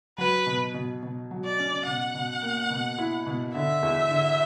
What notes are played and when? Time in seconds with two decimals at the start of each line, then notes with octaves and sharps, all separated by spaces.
0.18 F#3 B4
0.46 B2
0.74 B2
1.03 B2
1.31 F#3
1.44 D5
1.59 C#4
1.87 B2 F#5
2.15 B2
2.43 A#3
2.70 B2
2.98 E4
3.27 B2
3.54 D3 E5
3.83 E2
4.11 D3